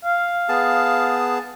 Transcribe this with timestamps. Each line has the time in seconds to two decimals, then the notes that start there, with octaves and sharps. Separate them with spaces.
0.05 F5
0.49 B3 G#4 A5